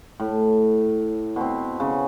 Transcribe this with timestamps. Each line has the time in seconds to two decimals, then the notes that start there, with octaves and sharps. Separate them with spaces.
0.20 A2
1.36 B2 C4
1.80 C#3